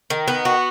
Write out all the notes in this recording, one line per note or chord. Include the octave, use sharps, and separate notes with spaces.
D#3
B3
F#4